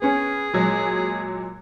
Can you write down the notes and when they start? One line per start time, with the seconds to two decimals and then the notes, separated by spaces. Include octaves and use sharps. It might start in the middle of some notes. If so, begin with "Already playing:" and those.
0.02 B3 C#4 G#4
0.53 A#2 F#3 G#3